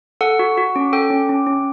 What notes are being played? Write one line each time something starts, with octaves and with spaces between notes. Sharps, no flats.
A4 F#5
F#4
F#4
C#4
A4 G5
C#4
C#4
C#4